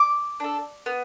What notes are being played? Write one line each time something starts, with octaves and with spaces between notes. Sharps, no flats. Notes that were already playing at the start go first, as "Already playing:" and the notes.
Already playing: D6
D4 A4
B3